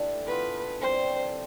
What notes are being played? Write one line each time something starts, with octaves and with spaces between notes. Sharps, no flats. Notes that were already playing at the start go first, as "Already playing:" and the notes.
Already playing: E3 A3 D4 G4 A4
E3 B3 F4 B4
E3 G3 C4 C5